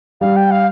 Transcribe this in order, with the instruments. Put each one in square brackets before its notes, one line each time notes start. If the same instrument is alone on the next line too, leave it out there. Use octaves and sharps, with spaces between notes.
[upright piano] G3 [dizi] F5
[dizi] G5
F5